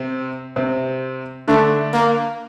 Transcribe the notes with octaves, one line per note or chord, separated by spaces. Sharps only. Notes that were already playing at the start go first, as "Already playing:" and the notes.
Already playing: C3 C4
C3 C4
D3 A3 D4
A#3